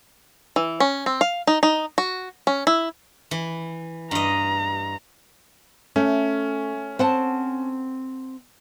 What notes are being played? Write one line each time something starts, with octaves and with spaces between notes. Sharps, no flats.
E3
C#4
C4
F5
D#4
D#4
F#4
C#4
E4
E3
G2 D#5 A#5
A3 C#4
C4 F#5 A5